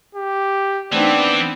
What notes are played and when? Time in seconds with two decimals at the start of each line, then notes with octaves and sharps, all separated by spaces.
0.15 G4
0.93 E3 A3 B3 C4 D4 D#4 D5